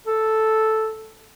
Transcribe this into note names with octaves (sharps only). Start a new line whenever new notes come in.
A4